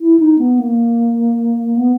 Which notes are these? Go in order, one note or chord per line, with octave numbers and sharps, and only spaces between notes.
E4
D#4
B3
A#3
B3